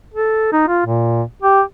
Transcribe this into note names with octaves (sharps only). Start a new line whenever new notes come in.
A4
D#4
F4
A#2
G4